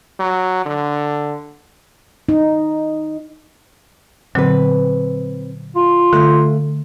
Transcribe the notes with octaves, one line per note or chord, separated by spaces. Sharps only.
F#3
D3
D#4
A#2 D3 F#3 C4 B4
F4
D3 A3